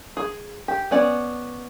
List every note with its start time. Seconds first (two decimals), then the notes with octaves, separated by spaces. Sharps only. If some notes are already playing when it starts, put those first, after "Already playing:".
0.17 G#4
0.68 G4
0.91 B3 C#4 D5